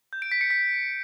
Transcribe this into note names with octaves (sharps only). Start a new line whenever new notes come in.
G6
D7
B6
C#7
B6